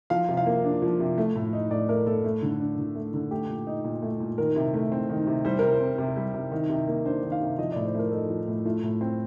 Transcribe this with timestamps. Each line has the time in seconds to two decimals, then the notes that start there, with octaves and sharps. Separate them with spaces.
0.10 F3 F5
0.28 C3
0.37 F5
0.46 A#3
0.64 D4
0.82 F3
1.00 C3
1.18 A3
1.36 A2
1.53 D#4
1.71 A2 D5
1.89 A3 A#4
2.06 A2 A4
2.24 A3
2.42 D3
2.60 D4
2.78 D3
2.95 A3
3.14 D3
3.31 A3 G4
3.49 A#2
3.67 D#4
3.84 A#2
4.02 A3
4.20 A#2
4.38 D#3 A#4
4.56 C3
4.74 A3
4.92 C4
5.09 D#3
5.27 C3
5.45 G3 C5
5.59 C3 A#4
5.73 C5
5.81 C4
5.98 C3
6.16 G3
6.34 C3
6.52 D#3
6.70 C3
6.88 A#3
7.05 D4 C5
7.23 D#3
7.32 F5
7.41 C3
7.58 F3 D#5
7.72 A2 D5
7.85 C5
7.94 A3 A#4
8.12 D#4 A4
8.30 F3
8.48 A2
8.65 A3 F4
8.83 A2
9.01 C4